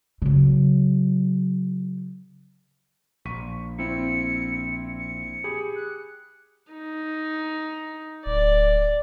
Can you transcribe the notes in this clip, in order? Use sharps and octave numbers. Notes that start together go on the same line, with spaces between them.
C#3 F#3
A#1 C#6 B6 D#7
C4 E4 C#7
C#7
G4 G#4 B5
F#6
D#4
D1 D5